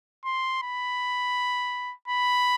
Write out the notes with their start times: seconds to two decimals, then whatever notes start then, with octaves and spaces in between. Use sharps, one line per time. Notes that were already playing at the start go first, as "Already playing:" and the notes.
0.25 C6
0.62 B5
2.08 B5